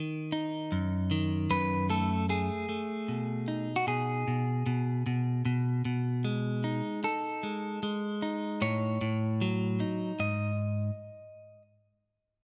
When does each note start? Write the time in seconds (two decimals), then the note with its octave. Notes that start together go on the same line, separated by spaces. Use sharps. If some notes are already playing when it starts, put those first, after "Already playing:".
Already playing: D#3
0.32 D#4
0.72 F#2
1.11 D#3
1.50 F#2 B4
1.90 A3 A4
2.29 A3 G#4
2.69 A3
3.08 B2
3.48 D#4
3.76 F#4
3.87 B2 G#4
4.28 B2
4.66 B2
5.06 B2
5.45 B2
5.85 B2
6.25 G#3
6.64 D#4
7.04 D#4 A4
7.43 G#3
7.83 G#3
8.22 D#4
8.62 A2 C#5
9.01 A2
9.41 F#3
9.80 D#4
10.19 G#2 D#5